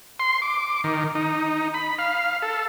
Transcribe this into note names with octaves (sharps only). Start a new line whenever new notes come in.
C6
D6
D#3
D#4
B5
F5
A4